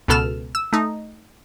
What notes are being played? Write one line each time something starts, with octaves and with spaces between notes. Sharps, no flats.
C#2 B2 B3 A4 F6 E7
E6
A3 D#4